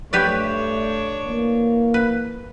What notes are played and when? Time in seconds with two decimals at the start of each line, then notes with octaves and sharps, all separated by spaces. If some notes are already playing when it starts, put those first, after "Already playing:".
0.13 G2 A3 D4 G4 B4 C#5 D5
1.26 E3 A#3
1.94 B4